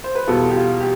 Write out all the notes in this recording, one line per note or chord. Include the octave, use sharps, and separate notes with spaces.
C5
B4
E2 B2 G3 F4 A4
G4
F4
G4